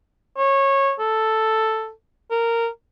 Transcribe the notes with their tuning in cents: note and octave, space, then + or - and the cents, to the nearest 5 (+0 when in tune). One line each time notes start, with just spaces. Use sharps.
C#5 -20
A4 +0
A#4 -10